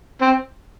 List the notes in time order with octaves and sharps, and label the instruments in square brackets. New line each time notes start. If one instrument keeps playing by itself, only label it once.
[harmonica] C4